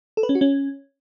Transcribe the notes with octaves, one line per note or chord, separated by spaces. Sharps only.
A4
B4
C#4
F#4
C#4